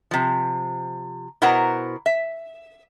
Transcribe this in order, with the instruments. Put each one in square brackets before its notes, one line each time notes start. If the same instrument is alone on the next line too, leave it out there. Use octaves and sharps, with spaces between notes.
[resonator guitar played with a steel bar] C3 F3
B2 E4 A#4 C5 F#5 A#5
E5